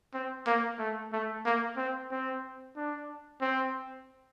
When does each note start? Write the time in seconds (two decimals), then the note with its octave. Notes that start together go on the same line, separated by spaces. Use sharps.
0.14 C4
0.46 A#3
0.79 A3
1.13 A3
1.45 A#3
1.77 C4
2.11 C4
2.76 D4
3.41 C4